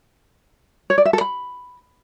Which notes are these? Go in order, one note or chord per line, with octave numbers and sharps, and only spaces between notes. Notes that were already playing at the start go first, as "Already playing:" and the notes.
C#5
D5
E5
A4
B5